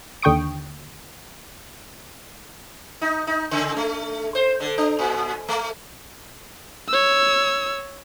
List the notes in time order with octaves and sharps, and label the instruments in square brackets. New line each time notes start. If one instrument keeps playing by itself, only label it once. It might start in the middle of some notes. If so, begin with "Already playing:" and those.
[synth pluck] D#2 D3 G5 C#6 D#6 D7
[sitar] D#4
D#4
C#3
A3
C5
D3
D4
A#2
A3
[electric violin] C#5 E6